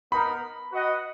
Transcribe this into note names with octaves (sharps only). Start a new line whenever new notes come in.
B3 D#4 A#4 B5
F#4 B4 D#5 F#5